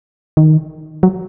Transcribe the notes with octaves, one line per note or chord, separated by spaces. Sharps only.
D#3
F#3